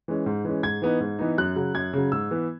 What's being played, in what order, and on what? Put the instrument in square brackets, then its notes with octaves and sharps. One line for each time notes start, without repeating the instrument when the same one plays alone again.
[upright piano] E3 G#3 C#4
G#2
E3 G#3 C#4
G#2 G#6
E3 B3 D#4
G#2
E3 B3 D#4
F#2 F#6
C#3 F#3
F#2 G#6
C#3 F#3
G#2 E6
E3 B3